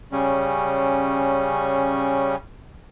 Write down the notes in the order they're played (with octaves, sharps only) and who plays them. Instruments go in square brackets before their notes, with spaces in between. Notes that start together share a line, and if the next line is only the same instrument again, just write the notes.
[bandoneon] C#3 G3 C#4